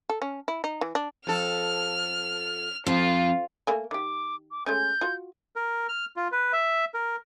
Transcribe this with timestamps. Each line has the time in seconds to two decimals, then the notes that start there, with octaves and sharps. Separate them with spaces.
0.10 A4
0.22 C#4
0.48 E4
0.64 D#4
0.81 E3
0.95 D4
1.27 F2 A4 F6
2.86 F2 F3 F4
3.67 A3 A#3 G#5
3.91 D#3 G4 D6
4.51 D6
4.66 G#3 A3 C#4 G6
5.01 F4 F#4
5.56 A#4
5.89 F6
6.16 F4
6.32 B4
6.53 E5
6.94 A#4